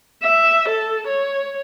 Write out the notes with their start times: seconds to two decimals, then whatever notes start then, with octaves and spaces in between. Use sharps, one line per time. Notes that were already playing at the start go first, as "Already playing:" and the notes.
0.23 E5
0.69 A4
1.07 C#5